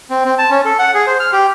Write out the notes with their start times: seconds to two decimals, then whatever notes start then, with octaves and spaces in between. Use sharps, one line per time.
0.10 C4
0.25 C4
0.38 A5
0.51 C#4
0.65 A4
0.79 F#5
0.94 G#4
1.07 C5
1.20 F6
1.33 G4